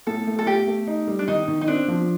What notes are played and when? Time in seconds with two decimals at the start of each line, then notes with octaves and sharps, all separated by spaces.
0.07 A2 A4
0.27 A3
0.39 A4
0.47 A3 G4
0.67 A3
0.87 D#4
1.07 G3
1.19 D4
1.28 D#3 D#4
1.48 D#3
1.61 D#4
1.68 C4 D4
1.88 F3